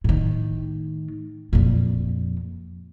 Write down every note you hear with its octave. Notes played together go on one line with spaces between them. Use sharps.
A2 D#3
F2 A#2